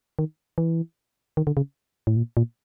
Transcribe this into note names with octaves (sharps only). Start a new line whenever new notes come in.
D#3
E3
D#3
D3
C#3
A2
A#2
A#2